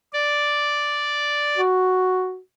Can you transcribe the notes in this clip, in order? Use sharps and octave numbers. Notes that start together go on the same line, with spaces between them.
D5
F#4